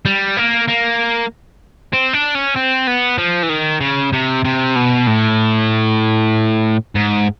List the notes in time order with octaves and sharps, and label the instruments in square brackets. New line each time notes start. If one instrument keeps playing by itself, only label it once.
[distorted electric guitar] G3
A#3
A#3
C4
D4
C#4
C4
B3
F3
E3
D#3
C#3
C3
C3
B2
A2
G#2